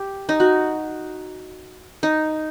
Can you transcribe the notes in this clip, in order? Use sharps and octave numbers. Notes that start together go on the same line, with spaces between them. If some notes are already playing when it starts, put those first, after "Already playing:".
Already playing: G4
D#4
F#4
D#4